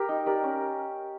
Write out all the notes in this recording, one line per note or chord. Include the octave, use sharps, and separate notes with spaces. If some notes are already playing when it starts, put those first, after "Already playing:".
Already playing: G4 A#4
D#4
G4 A#4 D5
C#4